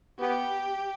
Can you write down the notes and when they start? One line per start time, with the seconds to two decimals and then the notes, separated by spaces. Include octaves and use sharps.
0.19 B3 G4